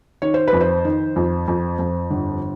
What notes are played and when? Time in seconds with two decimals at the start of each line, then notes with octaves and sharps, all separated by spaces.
0.22 D#3 C#5
0.34 C5
0.48 B4
0.53 F2
0.61 C5
0.85 D#3
1.16 F2
1.48 F2
1.79 F2
2.11 G1